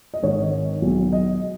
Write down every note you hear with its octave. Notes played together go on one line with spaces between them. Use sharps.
D#5
G#1 G#2 D#3 C#5
B1 B2 G#3
D#5